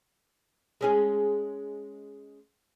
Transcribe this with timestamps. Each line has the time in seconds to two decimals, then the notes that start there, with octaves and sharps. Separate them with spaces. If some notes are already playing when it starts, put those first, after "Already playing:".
0.81 G#3 C#4 G#4